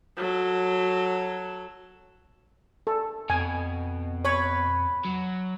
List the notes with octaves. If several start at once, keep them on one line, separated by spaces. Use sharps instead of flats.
F#3 A4
A4
F2 B2 G#5
B4 C#5 B5
F#3